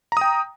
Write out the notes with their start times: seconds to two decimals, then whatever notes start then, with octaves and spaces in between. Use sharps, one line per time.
0.12 A#5
0.17 D#6
0.21 G5